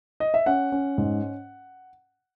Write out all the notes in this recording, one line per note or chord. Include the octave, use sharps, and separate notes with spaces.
D#5
E5
C#4 F#5
C#4
G#2